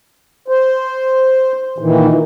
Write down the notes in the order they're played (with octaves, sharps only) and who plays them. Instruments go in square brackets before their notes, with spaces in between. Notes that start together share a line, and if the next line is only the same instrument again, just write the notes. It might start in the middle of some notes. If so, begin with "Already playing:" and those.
[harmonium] C5
A#2 D#3 E3